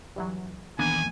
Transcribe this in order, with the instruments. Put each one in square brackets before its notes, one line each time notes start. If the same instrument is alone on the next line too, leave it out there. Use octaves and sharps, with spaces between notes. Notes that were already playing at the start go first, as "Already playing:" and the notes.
[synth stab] G2 E3 F#3
[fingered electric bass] E1 A#1 D#3 [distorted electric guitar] E2 [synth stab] A#3 B3 D4 [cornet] G#5